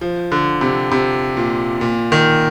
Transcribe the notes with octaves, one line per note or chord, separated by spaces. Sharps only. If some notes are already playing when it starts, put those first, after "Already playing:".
F3
D3
C3
C3
A#2
A#2
D#3